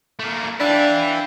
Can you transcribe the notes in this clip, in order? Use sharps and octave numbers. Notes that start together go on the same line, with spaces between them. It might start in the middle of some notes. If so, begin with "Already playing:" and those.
A3 A#3
D4 B4 E5 F5 G5